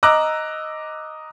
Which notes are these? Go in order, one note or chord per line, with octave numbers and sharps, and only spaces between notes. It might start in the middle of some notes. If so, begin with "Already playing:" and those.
D#5 A#5 D6 E6 F#6